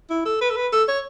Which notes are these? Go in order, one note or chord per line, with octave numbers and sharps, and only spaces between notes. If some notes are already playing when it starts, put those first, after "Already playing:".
E4
A4
B4
A4
B4
A4
C#5